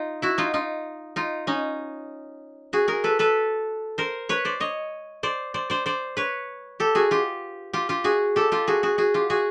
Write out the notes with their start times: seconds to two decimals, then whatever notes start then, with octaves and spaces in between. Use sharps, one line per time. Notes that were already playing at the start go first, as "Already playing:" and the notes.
Already playing: D#4 F4
0.22 E4 F#4
0.38 D#4 F4
0.54 D#4 F4
1.16 D#4 F4
1.47 C#4 D#4
2.73 F#4 G#4
2.88 G#4 A#4
3.04 A4 B4
3.19 A4 B4
3.98 A#4 C5
4.29 B4 C#5
4.45 C5 D5
4.60 C#5 D#5
5.23 C5 D5
5.54 C5 D5
5.70 C5 D5
5.86 C5 D5
6.17 B4 C#5
6.80 G4 A4
6.95 F#4 G#4
7.11 F4 G4
7.73 F4 G4
7.89 F4 G4
8.04 F#4 G#4
8.36 G4 A4
8.52 F4 G4
8.67 F#4 G#4
8.83 F#4 G#4
8.98 F#4 G#4
9.14 F4 G4
9.30 F#4 G#4